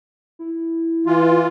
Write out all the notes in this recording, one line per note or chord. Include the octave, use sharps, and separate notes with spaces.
E4
E3 F4